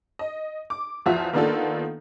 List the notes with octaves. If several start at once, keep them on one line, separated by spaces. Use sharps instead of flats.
D#5
D6
E2 F3 F4 F#4 E5
D#3 A#3 B3 D4 F4 A4